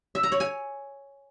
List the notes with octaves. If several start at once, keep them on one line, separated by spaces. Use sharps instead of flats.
E5
A#5
C#5
G#5